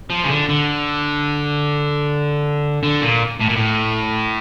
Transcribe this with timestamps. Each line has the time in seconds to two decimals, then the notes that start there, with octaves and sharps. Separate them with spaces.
0.10 F3
0.24 C#3
0.29 D3
0.49 D3
2.83 D3
3.02 A#2
3.40 A2
3.49 A#2
3.56 A2